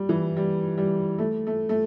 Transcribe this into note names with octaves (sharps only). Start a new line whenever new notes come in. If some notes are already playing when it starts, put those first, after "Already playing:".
Already playing: G3
E3
G3
G3
A3
A3
A3